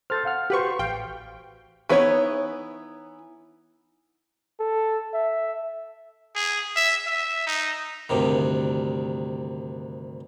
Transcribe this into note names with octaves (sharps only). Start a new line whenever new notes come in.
A4 C5 F6 A6
F5 F#5 F6
F#4 G4 B4 C5 C#6
A1 F5 G5
E3 B3 D#4 C#5
A4
E5
G#4
E5
E5
D#4
D2 G2 C3 D#3